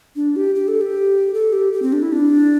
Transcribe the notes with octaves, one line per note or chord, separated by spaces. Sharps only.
D4
G4
G4
A4
G4
A4
G4
G4
C4
D4
E4
D4